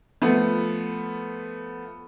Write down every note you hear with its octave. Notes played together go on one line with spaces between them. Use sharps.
F3 A3 B3